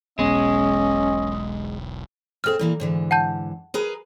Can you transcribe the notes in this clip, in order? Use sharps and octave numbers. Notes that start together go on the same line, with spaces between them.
E1 B1 G#3 B3 C#4 D#5
A#2 C4 G#4 A4 F6
A#2 E3 A#3
G#2 D3 E3
F#5 A5 G6
G#4 A#4 B4